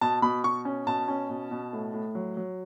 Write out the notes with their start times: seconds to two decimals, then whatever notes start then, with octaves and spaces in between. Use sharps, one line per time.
0.01 B2 A5
0.22 B2 B5
0.44 B2 C#6
0.65 C#4
0.87 B2 A5
1.08 C#4
1.29 B2
1.51 B2
1.73 A2
1.93 A2
2.15 F#3
2.37 F#3